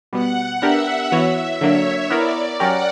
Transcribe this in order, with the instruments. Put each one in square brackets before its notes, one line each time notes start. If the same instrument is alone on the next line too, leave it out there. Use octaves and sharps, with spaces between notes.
[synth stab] B2 G3 B3 [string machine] F#5
[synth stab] B3 D4 G4 A#4 [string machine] E5
[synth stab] E3 B3 F#4 C#5
[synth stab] D3 F#3 A#3 D4 [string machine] C#5
[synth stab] B3 E4 A#4 [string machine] D5
[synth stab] F#3 C#4 G4 A#4 D5 [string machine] F#5